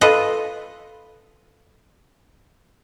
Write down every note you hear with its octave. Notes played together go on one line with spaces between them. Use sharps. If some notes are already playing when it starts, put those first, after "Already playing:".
F4 A4 B4 D#5